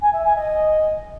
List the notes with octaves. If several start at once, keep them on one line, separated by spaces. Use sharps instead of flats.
G#5
E5
G#5
D#5